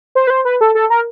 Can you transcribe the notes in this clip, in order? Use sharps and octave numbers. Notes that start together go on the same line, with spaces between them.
C5
B4
C5
B4
A4
A4
A#4